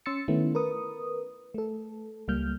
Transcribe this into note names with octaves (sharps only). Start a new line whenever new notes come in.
C#4 C6 E6 A6 C#7
D#3 A3 B3 C#4 E4
A#4 B4 D#6
A3 A4
C#2 G3 A#3 F6 G6